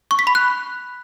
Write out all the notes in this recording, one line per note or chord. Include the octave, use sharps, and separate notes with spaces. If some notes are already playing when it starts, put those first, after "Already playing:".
C#6
B6
B5
F#6